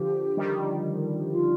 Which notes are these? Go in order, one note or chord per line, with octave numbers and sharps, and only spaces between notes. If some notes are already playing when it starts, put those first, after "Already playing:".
Already playing: D3 F3 G4
D#3 G3
F4